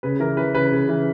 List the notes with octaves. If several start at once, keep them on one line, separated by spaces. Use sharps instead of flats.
C#3 B4
E3 A#4
E3 B4
C#3 B4
C#3
E3